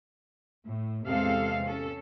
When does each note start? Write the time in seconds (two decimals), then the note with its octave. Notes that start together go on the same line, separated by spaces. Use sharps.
0.66 A2
1.08 E2 C3 G#3 C4 A4 F5
1.66 C#4 A4